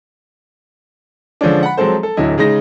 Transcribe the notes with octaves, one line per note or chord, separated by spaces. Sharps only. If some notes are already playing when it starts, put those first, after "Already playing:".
D3 F3 G#3 C#4 D4
F#5 B5
F3 F#3 G#3 C4 A4 C5
A4
D1 D3 F#3 E4 D#5
C#3 G#3 D#4 A#6